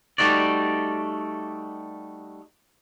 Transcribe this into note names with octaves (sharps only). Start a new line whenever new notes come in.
G3 A3 D#4 F#4 D5